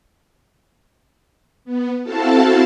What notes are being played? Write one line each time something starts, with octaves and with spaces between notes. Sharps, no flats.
B3
C4 E4 F#4 A4 F5 A5